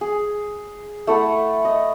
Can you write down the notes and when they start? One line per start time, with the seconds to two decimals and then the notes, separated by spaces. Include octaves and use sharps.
0.01 G#4
1.07 A3 E4 A4 F#5
1.65 D#5